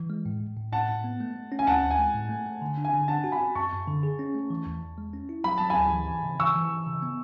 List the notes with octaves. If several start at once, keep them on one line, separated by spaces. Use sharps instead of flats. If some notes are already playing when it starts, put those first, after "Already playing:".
Already playing: E3
G#3
A2
A2
A2
A2 F#5 A5
A2
B3
A3
A3
C#4
G#5
D2 F#5 A5
D2
G#5
G#3
A2
A3
A3
D3
D4
G#5
D3
D4 F#5 A5
F#4
G#5 B5
F#4
F#2 A5 C#6
F#2
D3
G#4
C#4
A3
E3
E2
E2
G#3
C#4
E4
F#3 B5
F#3 A5
G#5 B5
D2
E3
E3
C#3
E3 C#6 E6
E3
E3
C#3
B3